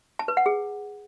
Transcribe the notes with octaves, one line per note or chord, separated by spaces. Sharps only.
A5
B4
F#5
G#4